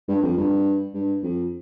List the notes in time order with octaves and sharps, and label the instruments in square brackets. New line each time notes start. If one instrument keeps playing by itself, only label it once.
[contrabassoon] G2
F2
G2
G2
F2